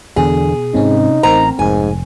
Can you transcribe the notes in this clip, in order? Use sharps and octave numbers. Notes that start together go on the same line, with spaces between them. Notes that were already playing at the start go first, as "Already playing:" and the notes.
E2 B2 D3 G#4
G#2 C3 C4 C#4 D#4
A1 C4 A#4 A#5
F1 G#2 G#5